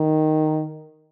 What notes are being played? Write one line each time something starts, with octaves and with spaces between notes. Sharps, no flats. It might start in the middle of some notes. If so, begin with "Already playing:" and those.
Already playing: D#3